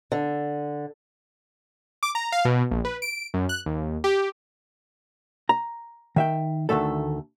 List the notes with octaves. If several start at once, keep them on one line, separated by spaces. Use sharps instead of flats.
D3
D6
A#5
F5
B2
A#1
B4
D7
F#2
F#6
D#2
G4
A#5
D#3 E5 G5
D2 G2 D#3 A3 A4